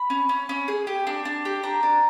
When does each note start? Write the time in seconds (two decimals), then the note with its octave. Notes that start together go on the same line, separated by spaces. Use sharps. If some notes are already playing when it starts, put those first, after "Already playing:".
Already playing: B5
0.10 C#4
0.29 C#4
0.49 C#4
0.68 G#4
0.87 G4
1.07 D4
1.25 D4
1.45 G4
1.63 D4 A#5
1.83 D4